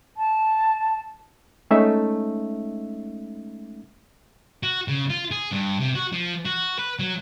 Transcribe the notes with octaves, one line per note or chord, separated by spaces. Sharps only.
A5
G#3 A3 C#4 D#4 E5
F#4
C#3
F4
G#4
G2
C3
F#4
F3
F#4
B4
F#3